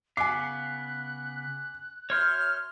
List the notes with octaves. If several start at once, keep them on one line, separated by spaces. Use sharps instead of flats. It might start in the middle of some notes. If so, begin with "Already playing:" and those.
C#3 B3 F5 G#5 D6 F#6
F#2 C#5 E5 C6 F6 G6